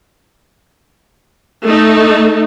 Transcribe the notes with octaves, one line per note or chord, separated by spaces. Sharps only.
A3 D#4